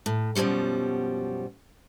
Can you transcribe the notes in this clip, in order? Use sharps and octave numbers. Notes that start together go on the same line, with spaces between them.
A2
F#2 B2 F3 G3 F#4